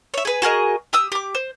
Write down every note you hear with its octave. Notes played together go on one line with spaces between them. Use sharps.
C#5 E5
G#4 B4
F#4 G#4 A#4 D#5
G4 D#6 E6
G4 D6
C5